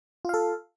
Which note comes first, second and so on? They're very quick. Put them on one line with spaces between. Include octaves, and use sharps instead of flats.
F4 F5 A4